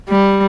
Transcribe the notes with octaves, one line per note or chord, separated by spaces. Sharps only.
G3